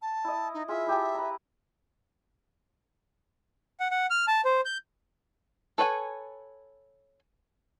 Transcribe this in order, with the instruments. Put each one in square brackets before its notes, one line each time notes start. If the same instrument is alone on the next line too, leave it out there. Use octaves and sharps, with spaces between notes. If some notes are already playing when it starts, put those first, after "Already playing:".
[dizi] A5
[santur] E4 D#5
[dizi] D#4
[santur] F4 G#4 [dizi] E5
[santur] E4 G4 A5
B4 A#5
[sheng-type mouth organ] F#5
F#5
F6
A5
C5
G6
[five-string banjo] A4 B4 C#5 G5 G#5